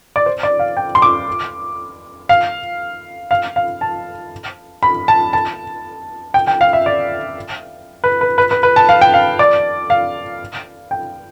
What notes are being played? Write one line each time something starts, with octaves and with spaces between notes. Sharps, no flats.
D5
C5
D5
F5
G5
C6
D6
F5
F5
F5
A5
B5
A5
A5
G5
G5
F5
E5
D5
B4
B4
B4
B4
B4
A5
F5
G5
F5
D5
F5
G5